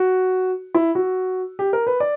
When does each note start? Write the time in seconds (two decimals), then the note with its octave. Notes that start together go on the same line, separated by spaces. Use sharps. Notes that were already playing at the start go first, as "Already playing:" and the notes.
Already playing: F#4
0.74 E4
0.95 F#4
1.59 G4
1.73 A#4
1.87 B4
2.00 D5